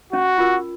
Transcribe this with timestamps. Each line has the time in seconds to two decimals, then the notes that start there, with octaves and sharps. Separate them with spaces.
0.13 C#4 F#4
0.38 F4 A#4